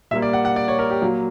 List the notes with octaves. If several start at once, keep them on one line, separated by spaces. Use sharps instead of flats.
A#2 G3 A#3 E5
D5
F#5
F#5
D5
C#5
A#4
G4
A#2 F#3 A#3